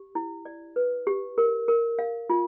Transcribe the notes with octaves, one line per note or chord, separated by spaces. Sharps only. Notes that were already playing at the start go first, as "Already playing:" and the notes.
Already playing: G4
E4
D5
B4
G4
A#4
A#4
F5
F4